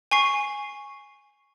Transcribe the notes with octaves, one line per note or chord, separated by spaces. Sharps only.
G#5 C#6 C7